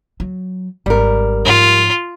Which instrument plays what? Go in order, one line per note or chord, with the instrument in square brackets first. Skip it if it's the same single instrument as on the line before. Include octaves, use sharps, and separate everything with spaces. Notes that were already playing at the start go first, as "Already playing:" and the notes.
[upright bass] F#3
[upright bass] G#1 [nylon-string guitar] G3 A#4
[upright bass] G#2 F3 [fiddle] F4